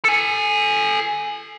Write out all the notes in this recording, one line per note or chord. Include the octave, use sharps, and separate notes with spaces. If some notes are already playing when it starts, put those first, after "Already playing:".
A4 G#5